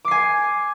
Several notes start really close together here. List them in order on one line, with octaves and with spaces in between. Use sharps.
D6 C7 G#5